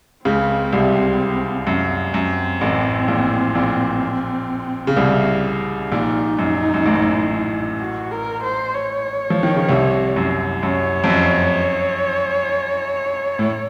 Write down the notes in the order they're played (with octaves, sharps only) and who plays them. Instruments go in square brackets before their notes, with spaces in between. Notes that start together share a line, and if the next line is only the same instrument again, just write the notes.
[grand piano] C#2 C#3 [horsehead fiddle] C4
[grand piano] C2 C3
F#2
[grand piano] F#2 [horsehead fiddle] C4
[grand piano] A1 A2
A#1 A#2
A#1 A#2
C#3
C2 C3
[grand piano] A#1 A#2 [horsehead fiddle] D#4
[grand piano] F#2
F#2
A1 A2
[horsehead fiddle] F#4
A#4
C5
C#5
[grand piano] F3
D#3
C#3
C2 C3
F#2
[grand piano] F#2 [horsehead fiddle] C#5
[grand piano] F2
F#2
A2